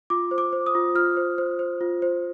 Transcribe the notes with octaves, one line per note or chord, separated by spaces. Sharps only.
F4 D6
C5
D6
C5
D#6
F4
F4 F6
C5
C5
C5
F4
C5